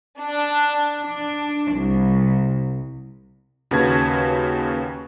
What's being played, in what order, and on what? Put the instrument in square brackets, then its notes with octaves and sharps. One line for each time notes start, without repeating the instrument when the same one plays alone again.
[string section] D4
D4
C2
[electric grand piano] D#2 C#3 F#4 B4 A5 G#6